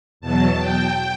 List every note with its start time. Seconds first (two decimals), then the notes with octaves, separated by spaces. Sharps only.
0.21 E2 B2 F#3 A5
0.58 G5